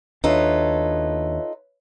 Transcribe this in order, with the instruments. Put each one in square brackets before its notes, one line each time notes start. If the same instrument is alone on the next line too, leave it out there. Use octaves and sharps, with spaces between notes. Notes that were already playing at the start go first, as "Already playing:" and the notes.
[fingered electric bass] D#2 D4 [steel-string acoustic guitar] D#4 F4 A4 [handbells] B4 C#5 E5